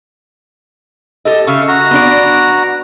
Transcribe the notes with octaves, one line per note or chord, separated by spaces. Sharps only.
G4 A4 D#5
C#3 E5 F5 C#6
F#4 A#5
B3 D4 D5